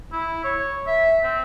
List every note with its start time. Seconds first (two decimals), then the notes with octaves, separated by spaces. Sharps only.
0.12 E4
0.44 C#5
0.87 E5
1.23 C4